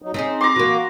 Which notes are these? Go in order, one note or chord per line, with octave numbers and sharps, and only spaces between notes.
F#3 D#4
C4 C#4 D#4 G#4
A#5 C6 D6
E3 A#3 F#4